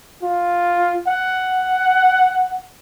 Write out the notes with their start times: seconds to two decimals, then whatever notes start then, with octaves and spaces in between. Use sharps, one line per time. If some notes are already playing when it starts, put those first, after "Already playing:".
0.23 F4
1.08 F#5